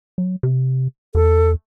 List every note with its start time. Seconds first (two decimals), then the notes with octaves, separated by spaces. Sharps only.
0.18 F#3
0.43 C3
1.15 E2 A4